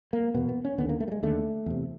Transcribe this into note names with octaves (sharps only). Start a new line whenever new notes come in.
A#3
E2 B2 B3
B3
C#4
D#2 D3 B3
A#3
A3
G3
G#3
D#2 D3 A3
E2 C3